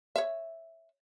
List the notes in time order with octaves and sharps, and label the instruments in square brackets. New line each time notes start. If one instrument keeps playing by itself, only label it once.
[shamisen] C#5 E5